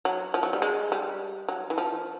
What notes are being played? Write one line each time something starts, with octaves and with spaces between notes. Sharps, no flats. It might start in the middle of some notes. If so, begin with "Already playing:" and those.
F#3
F3
F#3
G3
G#3
G3
F#3
E3
F3